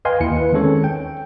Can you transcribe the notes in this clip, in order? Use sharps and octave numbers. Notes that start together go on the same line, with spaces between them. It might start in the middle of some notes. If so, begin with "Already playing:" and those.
B4 D#5 F5 G5 G#5 C6
D#2 E4 C#7
B4
D#3 G#3 C4 C#4 A4 C#5
G5